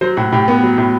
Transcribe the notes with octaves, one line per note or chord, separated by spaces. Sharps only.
F#3 C5
A2 F#4
A2 G4
B3
F#3
A2